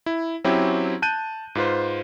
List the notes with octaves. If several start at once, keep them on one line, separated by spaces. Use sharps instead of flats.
E4
F#3 C4 C#4 E4 G4
A5 F#6 G6 D#7
G#2 F4 B4 C5